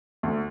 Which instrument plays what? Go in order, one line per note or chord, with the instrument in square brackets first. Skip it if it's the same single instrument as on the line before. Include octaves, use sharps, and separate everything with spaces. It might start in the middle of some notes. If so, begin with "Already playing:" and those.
[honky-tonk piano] D2